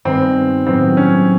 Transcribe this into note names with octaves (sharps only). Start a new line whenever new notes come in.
G2 D#3 G#3 B3 C4
A2 F#3 B3 C4 E4 G4
C#4